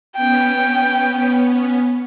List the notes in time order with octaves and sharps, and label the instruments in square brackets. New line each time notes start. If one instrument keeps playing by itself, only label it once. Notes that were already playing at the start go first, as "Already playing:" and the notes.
[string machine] B3 C#4 [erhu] G5